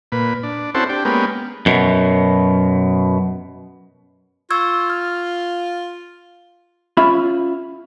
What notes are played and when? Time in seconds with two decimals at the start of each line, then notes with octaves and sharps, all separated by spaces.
0.12 A#2 B4
0.43 D4
0.75 C4 C#4 E4 F#4 A4 C5
0.89 D4 G4
1.05 G#3 A#3 B3 C#4 G4
1.66 F#2 B2
4.50 F4 C#6 E6 G#6
4.90 F6
6.97 C#4 F4 E5 B5